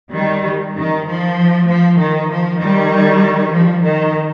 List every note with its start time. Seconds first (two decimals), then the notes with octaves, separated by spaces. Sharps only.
0.13 D#3 G3
0.76 D#3
1.06 F3
1.67 F3
1.98 D#3
2.28 F3
2.59 D#3 G3
3.52 F3
3.83 D#3